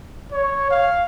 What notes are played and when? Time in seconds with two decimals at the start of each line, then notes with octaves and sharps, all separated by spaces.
0.32 C#5
0.71 F5